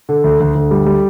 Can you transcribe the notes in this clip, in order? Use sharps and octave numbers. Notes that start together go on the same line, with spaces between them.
D3
D2
D2
D2
G3
G3